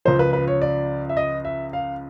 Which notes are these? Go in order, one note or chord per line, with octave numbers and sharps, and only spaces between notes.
C#2 C#3 F3 C5
B4
B4
C#5
D5
E5
D#5
E5
F5